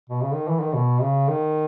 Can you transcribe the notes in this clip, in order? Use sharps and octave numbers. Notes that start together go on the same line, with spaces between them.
B2
C#3
D#3
E3
D#3
B2
C#3
D#3